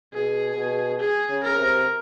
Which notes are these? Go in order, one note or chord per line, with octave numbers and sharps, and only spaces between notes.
B2 G#4
B2
G#4
C#3
A#4
C3